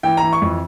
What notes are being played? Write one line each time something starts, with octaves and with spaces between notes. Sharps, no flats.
E3 G5
A#5
E3
C#6
F2